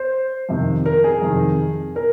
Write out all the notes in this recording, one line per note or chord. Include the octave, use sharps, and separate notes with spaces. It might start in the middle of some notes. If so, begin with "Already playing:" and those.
Already playing: C5
F2 C3 D#3
A#4
G#4
F2 C3 D#3
A#4